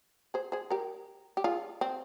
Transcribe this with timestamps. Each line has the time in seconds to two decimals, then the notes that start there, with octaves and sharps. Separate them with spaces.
0.34 G#4 C5
0.52 G#4 C5
0.70 G4 A#4
1.37 G4
1.44 F4 G#4
1.81 C4